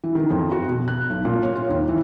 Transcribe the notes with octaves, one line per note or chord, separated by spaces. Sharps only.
E3
D#3
F2
F#4
B2
F#6
B1
A#2
C#5
F4
D#2
E3